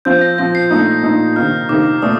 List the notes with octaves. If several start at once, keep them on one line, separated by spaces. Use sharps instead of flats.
F3 C4 F4 G6
A#6
F3 C4 F4 A#6
C7
A#2 A3 D#4
A#2 A3 D#4
C3 D#3 A#3 D#4 F6
C3 D#3 A#3 D#4 D6
A#2 A3 D4 D#6